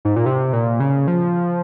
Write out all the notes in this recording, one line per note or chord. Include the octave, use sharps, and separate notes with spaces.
G#2
A#2
C3
A#2
C#3
F3